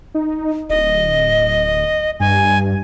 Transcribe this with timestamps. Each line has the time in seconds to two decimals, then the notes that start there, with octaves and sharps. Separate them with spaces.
0.15 D#4
0.70 D1 D#5
2.20 G2 G#5